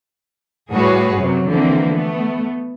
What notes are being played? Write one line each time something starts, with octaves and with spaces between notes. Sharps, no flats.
A2 G3 F#4 G#4 B4 C#5
F#2 C3 F#3
D3 E3 F3 A#3 C4
A3 B3